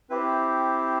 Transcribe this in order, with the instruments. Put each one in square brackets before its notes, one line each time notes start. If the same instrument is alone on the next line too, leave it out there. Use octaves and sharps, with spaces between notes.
[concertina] C4 E4 G4 B4